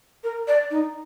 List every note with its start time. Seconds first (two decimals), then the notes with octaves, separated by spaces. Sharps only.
0.24 A#4
0.48 D5
0.71 D#4